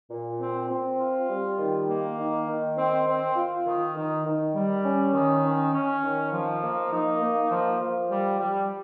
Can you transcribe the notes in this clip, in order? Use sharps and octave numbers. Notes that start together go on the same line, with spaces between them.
A#2
C4
C4
F4
G3
D#3
A#3
D#3
D#3
C4
C4
F4
D#3
D#3
D#3
G3
C#4
D#3
C#4
C#4
D#3
F3
A#3
D#4
A#3
F3
F3
G3
G3